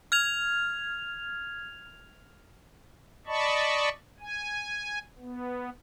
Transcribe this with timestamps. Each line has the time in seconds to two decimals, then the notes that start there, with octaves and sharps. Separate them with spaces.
0.12 F6 G#6 F7
3.27 D5 D#5 A5 B5 C#6
4.20 G#5
5.18 B3